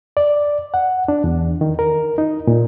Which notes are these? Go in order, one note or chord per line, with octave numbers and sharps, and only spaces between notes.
D5
F#5
D4
E2
D#3
A#4
D#4
A#2